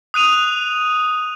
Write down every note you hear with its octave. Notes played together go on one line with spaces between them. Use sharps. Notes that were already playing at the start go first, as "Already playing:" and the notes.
D#6 F#6 D#7 F7